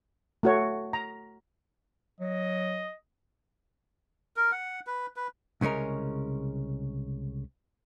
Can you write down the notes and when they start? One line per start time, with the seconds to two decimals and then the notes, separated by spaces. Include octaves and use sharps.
0.43 A3 F#4 C#5
0.93 A#5
2.20 F#3 D#5
4.36 A#4
4.52 F#5
4.87 B4
5.16 B4
5.61 C2 C#3 G#3 C#4 A#4